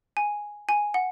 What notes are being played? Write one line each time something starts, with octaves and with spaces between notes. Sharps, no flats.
G#5
G#5
F#5